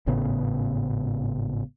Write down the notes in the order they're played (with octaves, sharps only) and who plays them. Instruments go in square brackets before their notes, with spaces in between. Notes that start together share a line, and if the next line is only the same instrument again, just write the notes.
[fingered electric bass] G#1 A2 C#3 B3